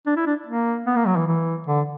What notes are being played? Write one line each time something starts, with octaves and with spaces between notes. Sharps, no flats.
D4
E4
D4
A#3
B3
A#3
F#3
E3
E3
D3